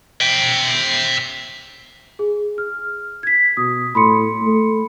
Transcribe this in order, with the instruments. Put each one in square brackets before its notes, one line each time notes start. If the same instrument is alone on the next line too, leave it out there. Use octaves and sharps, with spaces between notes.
[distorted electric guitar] E5 G5
[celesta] G#4
F6
G#6 B6
[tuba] B2 [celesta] D#6
[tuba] A2 [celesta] B5 C6 C#7
[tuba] A3